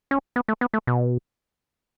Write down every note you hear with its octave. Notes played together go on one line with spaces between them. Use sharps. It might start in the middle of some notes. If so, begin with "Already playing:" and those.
C#4
B3
A3
B3
A3
B2